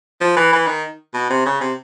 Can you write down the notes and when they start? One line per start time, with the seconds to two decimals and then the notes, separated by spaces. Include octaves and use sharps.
0.21 F3
0.37 E3
0.53 E3
0.67 D#3
1.14 B2
1.30 C3
1.46 C#3
1.61 C3